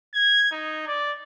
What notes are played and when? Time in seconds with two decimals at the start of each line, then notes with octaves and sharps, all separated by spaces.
0.14 G#6
0.52 D#4
0.87 D5